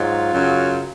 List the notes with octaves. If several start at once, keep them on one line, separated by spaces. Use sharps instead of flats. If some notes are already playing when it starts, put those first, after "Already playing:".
Already playing: G#2 F#3 F4
F#2 C#3 F#3